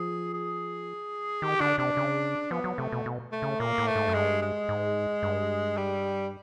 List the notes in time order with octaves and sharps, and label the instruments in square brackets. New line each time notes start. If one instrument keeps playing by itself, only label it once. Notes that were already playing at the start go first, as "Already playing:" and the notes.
Already playing: [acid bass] F3 [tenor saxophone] G#4
[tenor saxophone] G#4
[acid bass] D#3 [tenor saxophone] G4
[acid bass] D3 [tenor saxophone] D4
[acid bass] C3 [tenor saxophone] D4
[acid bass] C#3
[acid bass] F3 [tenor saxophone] B3
[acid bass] F#3
[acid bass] C3 [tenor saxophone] A3
[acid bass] B2
B2
[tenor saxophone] A3
[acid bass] C#3
[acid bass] A#2 [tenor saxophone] A#3
[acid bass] A2
[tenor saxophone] A3
[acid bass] G#2
F#2
[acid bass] G2 [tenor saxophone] G#3
[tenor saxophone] G#3
[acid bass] G#2
G2
[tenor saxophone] G3